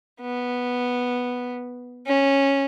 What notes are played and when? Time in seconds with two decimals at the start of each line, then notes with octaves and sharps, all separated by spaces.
0.22 B3
2.06 C#4